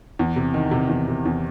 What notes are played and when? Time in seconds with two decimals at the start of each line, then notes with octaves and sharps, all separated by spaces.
0.19 E2
0.36 C3
0.54 D#3
0.71 C3
0.89 E2
1.08 C3
1.26 E2